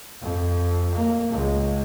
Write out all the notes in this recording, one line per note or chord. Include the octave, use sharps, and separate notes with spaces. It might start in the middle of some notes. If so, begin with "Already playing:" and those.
F2
A#3
C#2 G#3